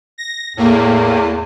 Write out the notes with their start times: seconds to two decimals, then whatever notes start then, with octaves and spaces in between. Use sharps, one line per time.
0.18 A#6
0.57 E2 A2 A#3